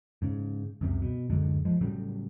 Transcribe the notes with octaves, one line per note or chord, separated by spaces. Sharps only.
G#2 C#3
C#2 F#2 C3
B2
D1 F#2 D3 G#3
F3 G#3
A2 C#3 F#3 G3